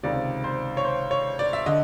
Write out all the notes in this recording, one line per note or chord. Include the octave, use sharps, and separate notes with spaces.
C#2 C3 D#3 D5
C5
C#5
C5
C#5
D5
E5
D3 D#5